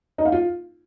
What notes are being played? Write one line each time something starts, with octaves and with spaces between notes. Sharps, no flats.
D#4
F5
F4